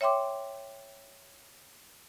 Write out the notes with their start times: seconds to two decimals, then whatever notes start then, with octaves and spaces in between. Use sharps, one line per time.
0.01 C#5 E5 G5 C6 D6